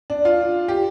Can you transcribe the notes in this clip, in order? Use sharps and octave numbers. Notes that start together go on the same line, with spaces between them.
D4
F4
G4